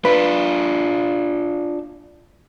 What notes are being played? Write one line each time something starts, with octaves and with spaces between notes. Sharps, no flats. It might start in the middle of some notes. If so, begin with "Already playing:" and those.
D4 F4 B4